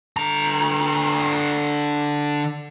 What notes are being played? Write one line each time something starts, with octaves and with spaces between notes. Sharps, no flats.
D3 A#5